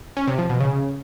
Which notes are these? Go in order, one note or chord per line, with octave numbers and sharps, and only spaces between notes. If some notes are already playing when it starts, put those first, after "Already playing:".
C#4
C3
F3
B2
C#3